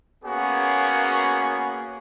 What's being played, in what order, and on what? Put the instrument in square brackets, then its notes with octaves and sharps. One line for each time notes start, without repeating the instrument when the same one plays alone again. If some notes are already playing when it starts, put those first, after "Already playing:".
[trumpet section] A#3 B3 C#4 F#4 G#4